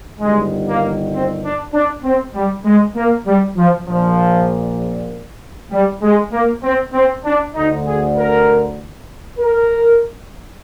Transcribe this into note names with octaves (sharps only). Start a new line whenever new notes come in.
G1 G2 D#3 G#3
A#3
C4
D4
D4
C4
G3
G#3
A#3
G3
F3
A#1 A#2 F3
G3
G#3
A#3
C4
C4
D4
D2 D3 D#4
G#4
A#4
A#4